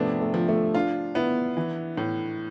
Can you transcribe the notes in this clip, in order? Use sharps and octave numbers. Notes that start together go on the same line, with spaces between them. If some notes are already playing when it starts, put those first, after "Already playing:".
Already playing: C3 F3 A3 B3 D4
A3
F3
A3
D4 F4
B3 E4
E3 E4
A2